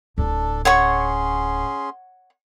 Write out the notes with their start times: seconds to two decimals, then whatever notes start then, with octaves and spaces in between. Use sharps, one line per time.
0.18 D1 A2 D4 A4
0.65 C#4 G#4 C#5 F#5 C6 C#6